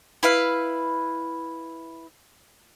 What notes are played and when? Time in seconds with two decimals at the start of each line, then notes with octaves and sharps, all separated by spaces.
0.23 E4 B4 F5